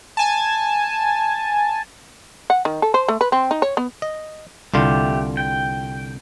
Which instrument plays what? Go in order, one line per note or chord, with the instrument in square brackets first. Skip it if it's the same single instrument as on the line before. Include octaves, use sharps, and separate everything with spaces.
[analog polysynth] G#5 A5
[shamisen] F#5
D#3
A4
C5
A3
B4
C4
D#4
C#5
B3
[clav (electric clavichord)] D#5
[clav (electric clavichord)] C2 D3 F4 [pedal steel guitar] A3 G4
[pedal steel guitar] G5